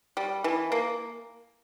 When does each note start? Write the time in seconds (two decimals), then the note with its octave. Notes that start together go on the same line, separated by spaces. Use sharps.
0.17 G3
0.44 E3
0.72 A#3